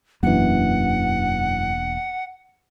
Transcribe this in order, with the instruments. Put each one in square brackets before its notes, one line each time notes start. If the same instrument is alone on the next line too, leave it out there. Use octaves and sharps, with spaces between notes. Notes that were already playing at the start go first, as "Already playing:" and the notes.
[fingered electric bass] E1 A#3 D4 [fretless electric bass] F#2 E3 [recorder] F#5